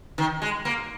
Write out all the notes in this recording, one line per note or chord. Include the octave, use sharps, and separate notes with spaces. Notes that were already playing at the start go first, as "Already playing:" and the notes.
D#3
G#3
A#3